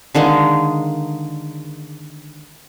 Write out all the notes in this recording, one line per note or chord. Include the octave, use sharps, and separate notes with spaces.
D3 D#3 G#3 A#3